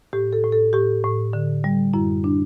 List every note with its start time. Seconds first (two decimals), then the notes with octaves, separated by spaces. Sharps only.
0.13 A2 G4
0.33 A4
0.44 A2
0.52 A4
0.73 A2 G4
1.04 A2
1.33 D3
1.64 G3
1.94 F#2 E4
2.24 D4